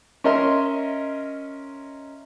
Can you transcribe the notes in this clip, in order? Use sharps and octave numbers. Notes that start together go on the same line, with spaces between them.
C#4 A#4 D#5 E5 C6